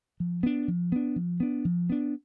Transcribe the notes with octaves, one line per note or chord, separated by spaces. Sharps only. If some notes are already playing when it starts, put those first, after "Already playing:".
F3
B3 D4
F3
B3 D4
F3
B3 D4
F3
B3 D4